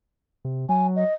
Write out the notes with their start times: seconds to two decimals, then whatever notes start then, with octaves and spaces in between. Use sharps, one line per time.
0.45 C3
0.69 F#3 G#5
0.96 D#5